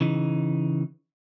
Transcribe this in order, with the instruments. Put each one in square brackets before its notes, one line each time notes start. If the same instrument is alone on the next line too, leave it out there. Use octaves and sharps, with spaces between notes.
[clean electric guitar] C#3 E3 D#4